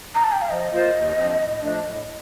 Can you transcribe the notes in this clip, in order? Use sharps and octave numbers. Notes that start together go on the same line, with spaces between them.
A#5
A5
G5
F5
F3 D#5
A#3 F4 C5
D#2
D3 F3 C4
A2
F3 A3 D4
A2